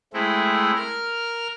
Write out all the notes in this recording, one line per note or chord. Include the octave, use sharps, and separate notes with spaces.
G#3 A3 C4 E4
A#4 F6